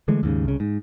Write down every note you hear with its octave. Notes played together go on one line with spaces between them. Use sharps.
D3 E3 G#3 A3
D#2 G#2 C#3
C2 C#3
G#2